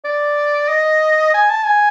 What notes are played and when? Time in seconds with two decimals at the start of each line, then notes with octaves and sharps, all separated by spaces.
0.05 D5
0.69 D#5
1.34 G#5
1.50 A5
1.66 G#5